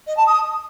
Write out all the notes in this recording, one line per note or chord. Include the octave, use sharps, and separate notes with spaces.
D#5
A5
D#6